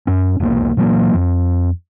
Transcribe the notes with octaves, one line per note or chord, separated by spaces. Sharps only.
F#2 C#4
E1 B1 A#3
A#2 E3 F#3 A#3
F2